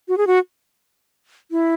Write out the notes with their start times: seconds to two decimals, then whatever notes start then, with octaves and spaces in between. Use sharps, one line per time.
0.08 F#4
0.18 G#4
0.27 F#4
1.51 E4